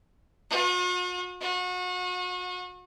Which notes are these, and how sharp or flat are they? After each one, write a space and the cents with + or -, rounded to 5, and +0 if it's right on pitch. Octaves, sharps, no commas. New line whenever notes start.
F#4 -45
F#4 -35